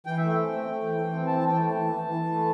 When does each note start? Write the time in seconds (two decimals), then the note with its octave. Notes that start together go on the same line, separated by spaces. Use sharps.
0.06 E3 G5
0.18 E5
0.23 A3
0.28 G5
0.36 C4
0.52 A3
0.67 A3
0.82 E3
0.97 E3
1.12 C4
1.26 E3 A5
1.41 E3
1.47 G5
1.56 A3
1.66 E3 A5
1.86 E3
2.01 E3
2.16 E3
2.31 A3